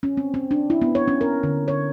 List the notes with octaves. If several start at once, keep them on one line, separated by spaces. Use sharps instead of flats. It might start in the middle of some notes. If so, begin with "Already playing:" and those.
C#4
C4
C4
D4
E4
B3
C#5
C#4
A#4
D3
C#5